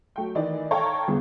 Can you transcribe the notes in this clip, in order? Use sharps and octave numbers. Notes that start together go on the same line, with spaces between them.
F#3 A3 G5
D#3 E3 D5 D#5
A4 C#5 F5 G5 A5 A#5
G1 E2 G2 C#3